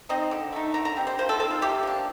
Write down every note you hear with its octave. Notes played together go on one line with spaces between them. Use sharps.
C4 D#4 D#5
D3
A3 D#4
D3 A#5
A#5
G3 C4
C5
F3 C5
A4
C4 D#4 A4
F4
C3 G4
F3 A#3 D4